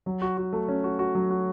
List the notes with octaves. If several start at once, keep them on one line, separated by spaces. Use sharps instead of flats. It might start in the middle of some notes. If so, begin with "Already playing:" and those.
F#3
F#4
F#4
A3
C#4
F#4
F#4
F#3
F#4